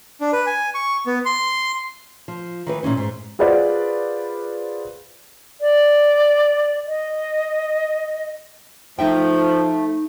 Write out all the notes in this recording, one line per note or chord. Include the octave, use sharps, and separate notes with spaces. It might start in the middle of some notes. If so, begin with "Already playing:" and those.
D4
B4
G#5
C#6
B3
C6
F3
D#3 E3 B4
A#2 E3 C#4 D#4
G#2
F4 G#4 B4 C5 D5 F#5
D5
D#5
F3 A3 D#4 E5 G5